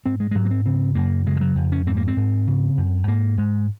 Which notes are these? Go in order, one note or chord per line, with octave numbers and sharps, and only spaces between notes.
G#2 C4
G#3
G#3
G#2 F#3
A#3
C4
C#3 C4
F#2 A#3
C#3 G#3
F3
F#3
F2
C#4
G#2 C4
A#3
C4
G#2
C#3
F#2
G#2 A#3
G#2 G#3